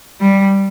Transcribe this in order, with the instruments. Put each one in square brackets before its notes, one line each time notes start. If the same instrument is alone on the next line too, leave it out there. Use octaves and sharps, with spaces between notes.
[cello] G3